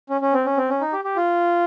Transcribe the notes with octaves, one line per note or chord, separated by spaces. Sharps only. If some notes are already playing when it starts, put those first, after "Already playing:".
C#4
C#4
C4
C#4
C4
C#4
D#4
G4
G4
F4